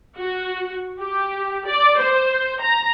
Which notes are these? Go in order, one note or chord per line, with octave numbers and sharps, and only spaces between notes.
F#4
G4
D5
C5
A#5